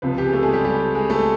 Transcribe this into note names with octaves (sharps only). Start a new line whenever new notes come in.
C#2 C3 F3 B3 B4
G4
G#4
A3 A4
G#3 G#4
G3 G4
G3 G4
G#3 G#4
A3 A4